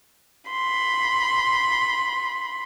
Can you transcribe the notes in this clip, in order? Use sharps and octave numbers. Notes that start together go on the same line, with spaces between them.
B5 C6